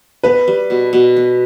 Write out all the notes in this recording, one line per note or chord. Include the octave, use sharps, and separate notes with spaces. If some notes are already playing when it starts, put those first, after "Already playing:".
B3 B4
G3
B2
B2
B3